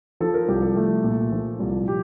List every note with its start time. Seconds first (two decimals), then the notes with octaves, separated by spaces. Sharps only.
0.20 F3 A4
0.34 A#4
0.48 C2 G4
0.62 A4
0.76 A3
1.04 A#2
1.32 F3
1.60 C2
1.88 G4